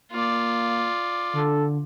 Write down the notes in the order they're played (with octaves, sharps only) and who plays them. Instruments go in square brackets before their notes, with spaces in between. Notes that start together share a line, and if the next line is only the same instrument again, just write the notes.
[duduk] A#3 [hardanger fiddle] F4 D5
[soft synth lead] D3 [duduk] A4